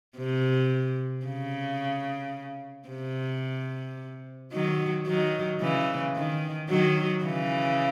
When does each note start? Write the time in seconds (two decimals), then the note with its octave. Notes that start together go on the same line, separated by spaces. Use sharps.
0.17 C3
1.26 C#3
2.89 C3
4.52 D#3 F#3
5.06 D#3 F#3
5.61 C#3 E3
6.16 D#3
6.69 D#3 F#3
7.24 C#3 E3